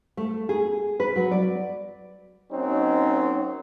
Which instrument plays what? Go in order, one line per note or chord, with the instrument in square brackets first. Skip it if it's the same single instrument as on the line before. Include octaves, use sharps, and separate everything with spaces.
[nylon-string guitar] A3
G#4
B4
F#3
D5
[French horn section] F#3 A#3 C4 C#4 D#4